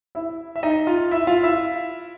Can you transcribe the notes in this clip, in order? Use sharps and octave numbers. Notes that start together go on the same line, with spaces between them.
E4 E5
E5
D#4 D#5
F4 F5
E4 E5
F4 F5
E4 E5